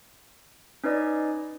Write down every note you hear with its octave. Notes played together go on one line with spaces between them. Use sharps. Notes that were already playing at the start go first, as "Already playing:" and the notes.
C#4 D#4 B4 D5 D#5